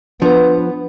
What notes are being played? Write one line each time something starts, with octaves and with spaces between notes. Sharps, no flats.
F3 B3 D4 B4